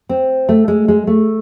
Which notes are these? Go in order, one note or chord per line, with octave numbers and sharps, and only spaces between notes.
C4
A3
G#3
G#3
A3